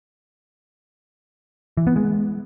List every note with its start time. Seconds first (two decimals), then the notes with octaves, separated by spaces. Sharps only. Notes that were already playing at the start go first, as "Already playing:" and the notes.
1.77 E3
1.87 B3
1.96 G#3